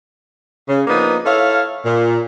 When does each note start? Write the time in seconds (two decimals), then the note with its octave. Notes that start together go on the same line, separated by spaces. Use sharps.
0.69 C#3
0.87 F3 A#3 B3 D4 D#4
1.25 E4 A4 C#5 F5
1.85 A#2